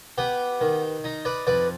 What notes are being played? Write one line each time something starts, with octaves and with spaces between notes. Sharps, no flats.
B3 G4 B4
D#3
D#4
B4 D5
F2 B4 D5